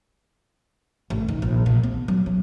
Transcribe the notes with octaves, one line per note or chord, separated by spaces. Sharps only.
A1
D#3
A#1
A#2
B3
F#3
C#4